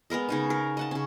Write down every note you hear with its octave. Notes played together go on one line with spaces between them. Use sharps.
G#3 B3 A#4 D#5
C#3 D#4 D#5
A#4
D#5 F#5 A5
C#3 C#4